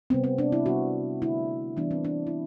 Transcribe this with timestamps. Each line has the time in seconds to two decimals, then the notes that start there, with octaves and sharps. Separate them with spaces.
0.10 C3 G3 B3 C4
0.24 C4
0.38 D4
0.52 E4
0.66 C3 G3 B3 F#4
1.22 D3 A3 E4
1.77 E3 G3 B3 D4
1.91 C4
2.05 D4
2.27 E4